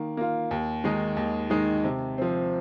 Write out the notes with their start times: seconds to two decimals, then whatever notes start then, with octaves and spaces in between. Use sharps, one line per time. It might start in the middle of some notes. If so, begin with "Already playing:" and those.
Already playing: D#3 A#3
0.17 A#3 F4
0.51 D#2
0.84 D#3 G#3 D#4
1.17 D#2
1.50 D#3 G#3 D#4
1.84 C3
2.18 F3 C4